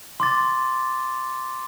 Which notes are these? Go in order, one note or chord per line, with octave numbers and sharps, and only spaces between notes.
C6 D6 A6